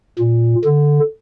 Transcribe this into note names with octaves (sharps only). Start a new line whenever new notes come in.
A#2
D3